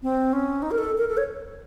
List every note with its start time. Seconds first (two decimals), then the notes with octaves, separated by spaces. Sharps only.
0.03 C4
0.33 C#4
0.62 D#4
0.71 A#4
0.78 A4
0.98 A#4
1.08 A4
1.17 C#5